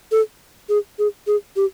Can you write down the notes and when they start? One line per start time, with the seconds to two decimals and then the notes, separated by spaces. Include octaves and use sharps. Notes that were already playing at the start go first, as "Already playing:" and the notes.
0.12 A4
0.69 G#4
0.99 G#4
1.27 G#4
1.56 G4